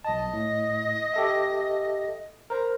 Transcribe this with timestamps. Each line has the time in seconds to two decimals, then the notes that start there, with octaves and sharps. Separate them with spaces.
0.05 B1 D#5 A5
0.33 A2
1.14 G4 A4 E5
2.50 A#4 C5 A#5